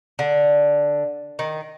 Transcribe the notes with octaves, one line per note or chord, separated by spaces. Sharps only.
D3
D#3